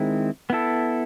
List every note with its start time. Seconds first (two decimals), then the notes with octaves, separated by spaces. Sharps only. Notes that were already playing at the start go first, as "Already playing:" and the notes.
Already playing: D#3 G#3 C4 E4
0.50 B3 E4 A4